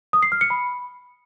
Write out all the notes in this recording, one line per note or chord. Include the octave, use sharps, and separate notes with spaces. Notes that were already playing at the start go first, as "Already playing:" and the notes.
D#6
C7
F6
C#7
B5